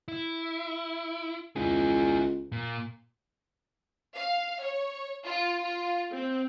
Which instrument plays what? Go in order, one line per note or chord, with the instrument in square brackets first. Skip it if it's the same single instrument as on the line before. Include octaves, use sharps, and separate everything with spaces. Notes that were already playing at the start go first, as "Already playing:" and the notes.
[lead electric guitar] E4
[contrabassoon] C#2 [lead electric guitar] E4 G#4
[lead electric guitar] A#2
[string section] F5
C#5
F4
F4
C4